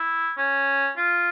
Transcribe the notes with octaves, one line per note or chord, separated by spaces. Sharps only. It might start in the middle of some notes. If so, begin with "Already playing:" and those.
Already playing: E4
C#4
F4